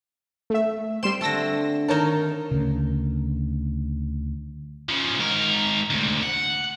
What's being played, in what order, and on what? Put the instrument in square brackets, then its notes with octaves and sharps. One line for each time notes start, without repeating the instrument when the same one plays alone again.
[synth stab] A3 E5
[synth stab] G3 C6 E7 [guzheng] C4
[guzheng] D3 A3 [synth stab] A5 E6 A#6
[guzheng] D#3 D#4 [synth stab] A#4 C#5 A5
[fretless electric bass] D2 C#3
[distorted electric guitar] C#3 F3
G#2 A#4
D2 C3
F#5